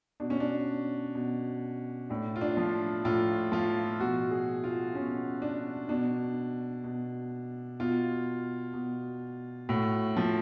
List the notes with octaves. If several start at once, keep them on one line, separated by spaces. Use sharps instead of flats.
B2 D4
C#4
D4
B2
A2 D4
F4
D4
F3
A2 F4
F3 F4
B2 F#4
G#4
F4
B2 C#4
D4
B2 D4
B2
B2 F4
B2
A2 F#4
F3